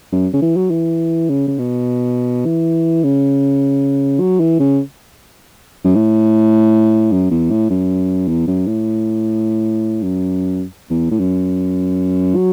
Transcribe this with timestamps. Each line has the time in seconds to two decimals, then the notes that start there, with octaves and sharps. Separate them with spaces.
0.12 F#2
0.34 C#3
0.42 E3
0.57 F#3
0.71 E3
1.29 C#3
1.48 C#3
1.58 B2
2.46 E3
3.03 C#3
4.20 F#3
4.40 E3
4.60 C#3
5.84 F#2
5.95 A2
7.12 F#2
7.31 E2
7.51 A2
7.70 F#2
8.28 E2
8.47 F#2
8.67 A2
10.03 F#2
10.90 E2
11.11 A2
11.19 F#2
12.36 F#3